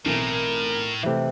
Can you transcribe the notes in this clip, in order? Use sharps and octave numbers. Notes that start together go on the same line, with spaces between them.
B1 A2 E3 C4 A#4
C3 E3 A3 E4